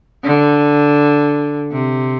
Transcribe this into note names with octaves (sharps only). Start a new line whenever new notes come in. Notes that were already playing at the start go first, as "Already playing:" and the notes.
D3
C3